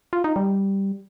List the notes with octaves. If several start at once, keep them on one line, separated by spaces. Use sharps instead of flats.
F4
D#4
G3